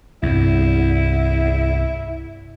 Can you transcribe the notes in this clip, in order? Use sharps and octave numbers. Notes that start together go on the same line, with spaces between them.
C2 G2 E4